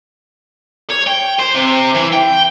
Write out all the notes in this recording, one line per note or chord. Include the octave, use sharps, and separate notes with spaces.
C#5
G5
C5
C3
E3
G5